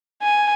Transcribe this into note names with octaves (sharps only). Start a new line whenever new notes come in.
G#5